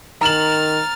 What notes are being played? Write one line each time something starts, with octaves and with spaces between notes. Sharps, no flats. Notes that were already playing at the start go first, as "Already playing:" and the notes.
D#3 A#5 F6 A6 E7 F#7